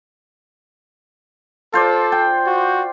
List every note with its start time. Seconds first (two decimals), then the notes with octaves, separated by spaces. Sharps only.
1.74 F4 A4 C5 D5
2.12 G5
2.47 F#4